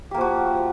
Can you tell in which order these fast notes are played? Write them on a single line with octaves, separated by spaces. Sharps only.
G4 A#3 F3 F#4